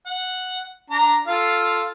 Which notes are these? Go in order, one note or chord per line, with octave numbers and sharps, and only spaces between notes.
F#5
D4 A#5
F4 A4 F5